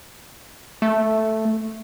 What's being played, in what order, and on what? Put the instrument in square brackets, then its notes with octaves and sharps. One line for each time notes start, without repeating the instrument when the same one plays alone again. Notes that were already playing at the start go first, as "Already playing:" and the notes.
[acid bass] A3